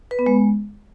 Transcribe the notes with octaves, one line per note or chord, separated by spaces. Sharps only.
B4
B3
G#3